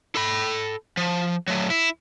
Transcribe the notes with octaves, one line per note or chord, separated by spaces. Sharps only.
A4 B5
F3
F#3 A3
E4